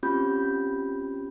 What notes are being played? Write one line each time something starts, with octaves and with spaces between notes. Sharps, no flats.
C4 C#4 F4 G4 B5 G6